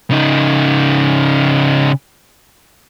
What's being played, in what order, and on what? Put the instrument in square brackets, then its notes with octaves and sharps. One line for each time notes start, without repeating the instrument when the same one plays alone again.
[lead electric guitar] C#3 D#4